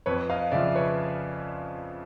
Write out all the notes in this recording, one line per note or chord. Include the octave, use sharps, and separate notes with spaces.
F2 B4 C#5
D#5 F5
C#3 F3 D5 E5
B4 C#5